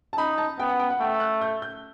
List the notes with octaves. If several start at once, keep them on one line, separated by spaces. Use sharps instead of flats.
A5
D#4 B5
A5
B3 G5
F#5
G5
F#5
A3 G5
F#6
G6
G6